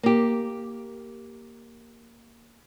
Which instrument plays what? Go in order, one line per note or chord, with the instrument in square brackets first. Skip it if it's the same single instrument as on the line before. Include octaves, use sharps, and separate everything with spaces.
[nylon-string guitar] A#3 G4